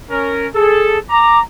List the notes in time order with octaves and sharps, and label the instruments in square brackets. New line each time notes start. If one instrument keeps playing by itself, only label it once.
[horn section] C#4 A#4
[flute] G#4 [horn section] A4
[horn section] A#5 [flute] D6